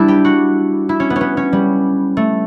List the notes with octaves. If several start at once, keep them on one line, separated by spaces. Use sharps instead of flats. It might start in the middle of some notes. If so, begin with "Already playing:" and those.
Already playing: G3 D4 E4
G4
F#4
E4
C#4
B3
C#4
B3
C#4
G3
A3